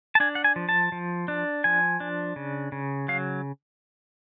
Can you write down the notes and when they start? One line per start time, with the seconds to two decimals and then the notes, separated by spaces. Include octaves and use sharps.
0.15 A5
0.20 D4 G#5
0.35 F#5
0.44 G#5
0.56 F3
0.69 A5
0.92 F3
1.28 D4
1.64 F3 G#5
2.00 D4
2.36 C#3
2.72 C#3
3.08 F#3 F5